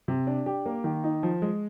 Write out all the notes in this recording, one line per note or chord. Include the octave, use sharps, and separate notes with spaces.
C3
D4
G4
A#3
D#3
D#4
F3
G#3